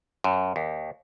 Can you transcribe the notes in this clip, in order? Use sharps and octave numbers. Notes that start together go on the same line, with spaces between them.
F#2
D#2